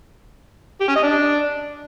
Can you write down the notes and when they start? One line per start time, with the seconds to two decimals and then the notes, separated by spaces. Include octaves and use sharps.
0.81 G4
0.88 C#4
0.96 D#5
1.03 D4